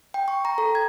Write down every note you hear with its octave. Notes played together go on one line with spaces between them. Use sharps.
G5
C#6
A#5
A4
G#6